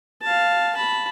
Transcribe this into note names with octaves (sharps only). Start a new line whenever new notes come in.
F5 A5
A5 B5